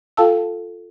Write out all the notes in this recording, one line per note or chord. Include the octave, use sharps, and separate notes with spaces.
F4 A4 F5 G5 A5 E6